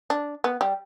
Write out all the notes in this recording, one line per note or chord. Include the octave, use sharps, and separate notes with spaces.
D4
B3
G3